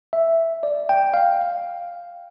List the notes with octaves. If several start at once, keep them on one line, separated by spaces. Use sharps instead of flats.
E5
D5
G5
F5